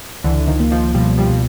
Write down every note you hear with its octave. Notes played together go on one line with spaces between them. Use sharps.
C#2 D3 E3
D#3 F3
A#3
D#3 F3
B2 F3 G3
F3 G3
B2